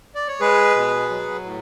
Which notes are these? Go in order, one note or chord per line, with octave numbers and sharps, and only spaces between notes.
D5
C#5
G#3 G#4 B4
B2
F#3
A2